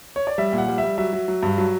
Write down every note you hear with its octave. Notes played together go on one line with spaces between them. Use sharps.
C#5
D5
G3 E5
A#2
F#5
G3
E5
G3
F#3 E5
F#3
F#3
G2
F#3